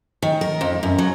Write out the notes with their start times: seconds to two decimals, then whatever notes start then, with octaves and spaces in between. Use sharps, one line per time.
0.22 D#3
0.41 A#4
0.61 F2
0.83 F#2
0.98 F#3